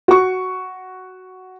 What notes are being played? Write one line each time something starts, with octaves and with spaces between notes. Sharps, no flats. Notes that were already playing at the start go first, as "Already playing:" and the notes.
F#4 C#6